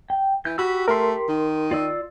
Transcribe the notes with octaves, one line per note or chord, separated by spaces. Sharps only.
G5
E3 G6
F#4 G4 B5 E6
A3 A#4 C6
D#3
F4 D5 E6